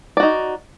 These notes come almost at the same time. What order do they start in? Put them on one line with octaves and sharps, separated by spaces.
D5 F#4 D#4